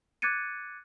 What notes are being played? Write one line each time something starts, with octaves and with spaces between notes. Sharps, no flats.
D6 F#6 G#6 A6 C#7 D#7